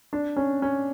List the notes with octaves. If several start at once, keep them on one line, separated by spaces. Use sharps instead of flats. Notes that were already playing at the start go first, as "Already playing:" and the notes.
D4
C#4
C#4